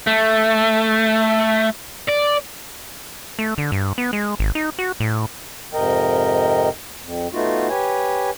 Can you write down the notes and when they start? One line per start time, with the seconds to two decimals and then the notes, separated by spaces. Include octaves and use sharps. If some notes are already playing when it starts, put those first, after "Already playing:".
0.07 A3
2.09 D5
3.39 A3
3.58 D3
3.72 G2
3.98 B3
4.13 G#3
4.39 G#1
4.55 D#4
4.79 F#4
5.00 A2
5.73 F2 G#2 C3 A#4 D#5 G5
7.03 F2
7.32 A3 B3 D#4 F4 F#4
7.69 G4 B4 C#5 G#5